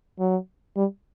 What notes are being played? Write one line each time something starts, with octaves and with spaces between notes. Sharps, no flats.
F#3
G3